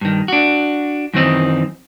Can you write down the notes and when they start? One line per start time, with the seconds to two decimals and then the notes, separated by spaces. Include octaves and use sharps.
0.01 G2 D#3
0.28 D4 F#4
1.14 F#2 D#3 E3 C4 D#4